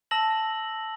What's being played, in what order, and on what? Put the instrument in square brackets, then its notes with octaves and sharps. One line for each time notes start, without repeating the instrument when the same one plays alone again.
[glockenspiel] A5 E6 A#6 F#7